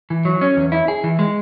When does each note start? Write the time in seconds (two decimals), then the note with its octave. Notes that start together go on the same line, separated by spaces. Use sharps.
0.10 E3
0.25 F#3
0.41 C#4
0.57 E2
0.72 E4
0.88 G#4
1.04 E3
1.19 G#3